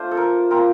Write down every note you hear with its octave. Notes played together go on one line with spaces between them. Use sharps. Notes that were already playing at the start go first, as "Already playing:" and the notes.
Already playing: A3 D4 F4 C5
A4
A#4
F3 C4 F4 A#4